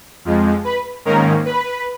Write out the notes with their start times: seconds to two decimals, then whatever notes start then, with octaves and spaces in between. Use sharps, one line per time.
0.25 F2 F3 G#3
0.64 B4 B5
1.05 G#2 D#3 A#3 C#4 A#4 A#5
1.45 B4 B5